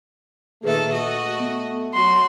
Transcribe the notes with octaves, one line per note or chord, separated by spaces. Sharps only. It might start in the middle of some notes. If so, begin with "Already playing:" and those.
A#2 D#3 A3 G#4 A4 B4 E5
F#4 D#5
B3
F#3 F#4 C6